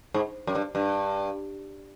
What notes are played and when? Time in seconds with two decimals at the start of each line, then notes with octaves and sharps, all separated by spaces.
0.14 G#2
0.47 F#2
0.55 G2
0.75 G2